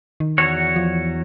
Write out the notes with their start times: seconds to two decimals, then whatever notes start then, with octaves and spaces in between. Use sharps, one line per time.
0.20 D#3
0.38 E2 F#4 C#5
0.76 F3